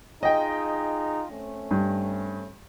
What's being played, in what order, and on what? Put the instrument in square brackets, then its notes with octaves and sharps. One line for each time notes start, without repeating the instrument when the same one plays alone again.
[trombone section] D#4 F4 G#4 [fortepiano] D#5 G5
[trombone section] A3 C4 C#4
[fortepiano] G2